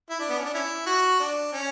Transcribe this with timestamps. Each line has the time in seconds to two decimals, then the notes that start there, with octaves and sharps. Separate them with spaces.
0.10 E4
0.19 D4
0.29 B3
0.38 C#4
0.45 D4
0.54 C#4 E4
0.86 F#4
1.20 D4
1.53 C#4